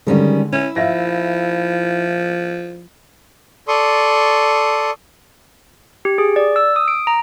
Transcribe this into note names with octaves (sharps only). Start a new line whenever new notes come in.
D3 D#3 G3 G#3 C#4
C#4 E4
F3 E5 F5 A#6
A4 D5 C6 C#6 D#6
G4
G#4
D5
E6
D#6
D7
A#5